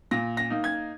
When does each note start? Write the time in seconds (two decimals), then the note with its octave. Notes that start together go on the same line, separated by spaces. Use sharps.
0.11 A#2 A#6
0.37 A#6
0.50 A#3 D#4
0.64 G#6